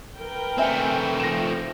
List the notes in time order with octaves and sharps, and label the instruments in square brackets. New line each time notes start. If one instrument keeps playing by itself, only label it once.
[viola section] A#4 B4 G5
[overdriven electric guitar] A3 C4 [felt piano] E5 G#5
[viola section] F3 [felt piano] A#6 E7